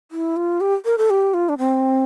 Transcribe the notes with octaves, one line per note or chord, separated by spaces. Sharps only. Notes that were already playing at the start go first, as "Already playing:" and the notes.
E4
F4
G4
A#4
A4
G4
F4
D4
C4